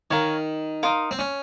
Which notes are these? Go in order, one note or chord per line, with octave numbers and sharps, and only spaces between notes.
D#3 C#5 F5 A#5
D#4 A#4 F5 C6
C4
C#4